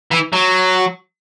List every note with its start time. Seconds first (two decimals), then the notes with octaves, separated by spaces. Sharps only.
0.11 E3
0.33 F#3